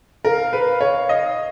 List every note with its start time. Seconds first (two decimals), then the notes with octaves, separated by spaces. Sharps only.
0.25 A#4 F5
0.53 B4
0.81 C#5
1.09 D#5